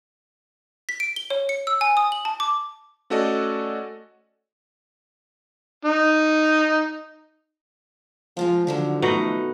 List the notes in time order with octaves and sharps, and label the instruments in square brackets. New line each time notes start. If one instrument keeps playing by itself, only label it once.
[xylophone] B6
D7
G7
C#5
C#7
E6
G#5
D#6
F#7
A5
D6
[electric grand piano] A3 C#4 F#4 A4 D5 D#5
[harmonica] D#4
[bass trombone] F3 [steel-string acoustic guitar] G#3 F4 F5
[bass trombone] D3 [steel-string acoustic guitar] D#3 F3 F#3
[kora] B2 D#4 F#4 [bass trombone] A3